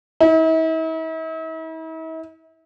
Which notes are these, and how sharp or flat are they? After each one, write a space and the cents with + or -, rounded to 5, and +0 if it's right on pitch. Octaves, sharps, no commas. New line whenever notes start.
E4 -45